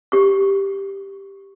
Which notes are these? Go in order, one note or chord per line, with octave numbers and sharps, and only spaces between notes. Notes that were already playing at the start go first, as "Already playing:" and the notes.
G4 C#6